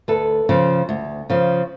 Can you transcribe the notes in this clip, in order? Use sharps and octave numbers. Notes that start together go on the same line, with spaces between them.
D2 A4 B4
C#3 F3
D2
C#3 F3